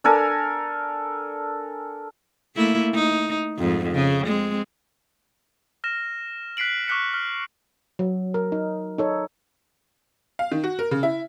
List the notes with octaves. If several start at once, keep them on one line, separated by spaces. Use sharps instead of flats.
D4 A4 A#4 G#5
A3 A#3 E4
D#4
F2 G#2
C#3
G#3 C4
F6 A#6 E7
F#6 B6 C7 D7 F#7
C#6 D6 F6 F#6 B6 C#7
F6
F#3
A#4
D#4
D#4 A4 C#5
F5
D#3
F#4
A#4
C#3
E4